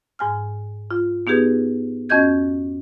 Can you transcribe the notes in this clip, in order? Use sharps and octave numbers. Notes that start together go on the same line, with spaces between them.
G#2 G#5 F6
F4
B3 D#4 G4 G#4 B4
F2 C#4 F#4 D#5 G6 G#6